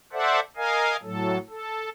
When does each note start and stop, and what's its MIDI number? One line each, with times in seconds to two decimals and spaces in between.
0.13 0.40 69
0.13 0.40 72
0.13 0.40 74
0.13 0.40 76
0.13 0.40 78
0.57 0.97 70
0.57 0.97 75
0.57 0.97 77
0.57 0.97 80
1.03 1.38 45
1.03 1.38 54
1.03 1.38 69
1.49 1.90 69